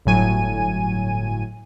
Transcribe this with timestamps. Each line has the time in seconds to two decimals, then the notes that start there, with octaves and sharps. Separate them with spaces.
0.05 G1 A2 F#3 G#5 D#7